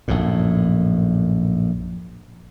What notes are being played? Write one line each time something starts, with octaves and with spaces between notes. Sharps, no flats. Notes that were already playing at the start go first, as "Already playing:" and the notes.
A#1 F#2 A2